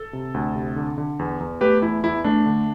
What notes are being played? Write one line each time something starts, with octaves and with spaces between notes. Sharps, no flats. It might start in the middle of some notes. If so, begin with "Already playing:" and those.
Already playing: A4
C3
D2
C3
D3
D3
E2
E2
A3 G4 B4
E2 E4
E2 E4
A3 D4
D3